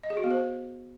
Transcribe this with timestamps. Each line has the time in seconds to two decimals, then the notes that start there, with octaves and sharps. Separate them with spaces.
0.03 D#5
0.10 G#4
0.17 F#4
0.24 B3
0.31 C5